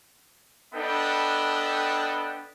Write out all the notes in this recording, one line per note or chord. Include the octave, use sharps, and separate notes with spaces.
B3 D4 A4 B4 D#5 G5